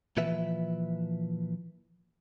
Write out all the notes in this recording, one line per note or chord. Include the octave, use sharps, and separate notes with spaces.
A#2 E3 F3 B4 E5